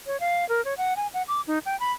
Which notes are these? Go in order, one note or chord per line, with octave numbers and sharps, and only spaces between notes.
C#5
F5
A#4
C#5
F#5
G#5
F#5
D6
D#4
G5
B5